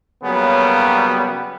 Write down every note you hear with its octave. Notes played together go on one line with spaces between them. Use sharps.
C#3 F#3 G3 A#3 B3